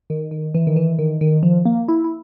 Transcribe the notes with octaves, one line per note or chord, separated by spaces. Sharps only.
D#3
D#3
E3
D#3
E3
D#3
D#3
F3
A#3
E4
E4